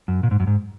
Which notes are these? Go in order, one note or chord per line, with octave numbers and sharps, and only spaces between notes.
F#2
A#2
G#2
F#2
G#2